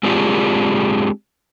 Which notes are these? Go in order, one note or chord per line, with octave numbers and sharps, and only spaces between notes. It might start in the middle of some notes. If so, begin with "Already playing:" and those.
G#3 C4 D4 F4 G4 G#4